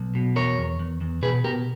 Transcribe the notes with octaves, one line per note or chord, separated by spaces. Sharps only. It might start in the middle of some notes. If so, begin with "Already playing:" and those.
Already playing: B1
B2
E2 A#4 C#5
E2
E2
E2
B2 G#4 B4
B2 G4 A#4